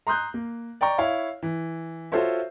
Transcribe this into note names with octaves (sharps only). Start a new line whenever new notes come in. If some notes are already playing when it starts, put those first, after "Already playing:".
A#5 C6 D#6 F#6 G6
A#3
D5 G5 A#5 C#6
E4 C#5 F5
E3
F4 F#4 A4 C5 C#5 E5